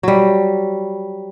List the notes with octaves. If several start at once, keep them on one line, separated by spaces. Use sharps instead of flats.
F#3 G3